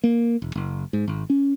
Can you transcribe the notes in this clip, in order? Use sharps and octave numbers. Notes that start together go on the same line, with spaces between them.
A#3
E1
F#1
G#2
G#1
C#4